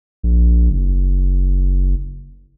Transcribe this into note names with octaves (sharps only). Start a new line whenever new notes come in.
A#1
F#1